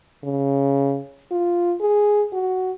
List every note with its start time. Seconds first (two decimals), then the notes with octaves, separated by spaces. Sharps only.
0.24 C#3
1.31 F4
1.81 G#4
2.33 F#4